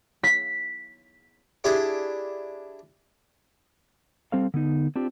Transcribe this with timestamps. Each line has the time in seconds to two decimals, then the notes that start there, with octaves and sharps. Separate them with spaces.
0.23 B6
1.64 D4 E4 G4 G#4
4.32 G3 C4 A4 C5 F5
4.54 D3 B3 D#4
4.96 C4 D4 F4 G4